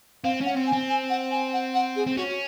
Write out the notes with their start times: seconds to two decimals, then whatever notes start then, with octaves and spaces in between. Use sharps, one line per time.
0.24 C4 F5
0.41 C#4 F#5
0.56 C4
0.67 G#5
0.73 C4
0.89 G#5
1.10 F#5
1.31 G#5
1.53 F#5
1.74 F#5
1.96 G#4
2.07 C4
2.17 C#4 F#4